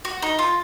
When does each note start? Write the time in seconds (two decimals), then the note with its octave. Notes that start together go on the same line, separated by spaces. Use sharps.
0.05 F#4
0.22 D#4
0.39 F4